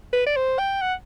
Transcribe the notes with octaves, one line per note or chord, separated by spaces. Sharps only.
B4
D5
C5
G5
F#5